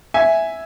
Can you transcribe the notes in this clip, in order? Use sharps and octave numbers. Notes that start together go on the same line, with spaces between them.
E5 G#5